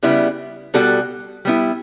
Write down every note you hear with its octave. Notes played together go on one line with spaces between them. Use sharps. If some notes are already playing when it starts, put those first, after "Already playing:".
C#3 G3 B3 E4
B2 G3 B3 F#4 A4
G3 B3 E4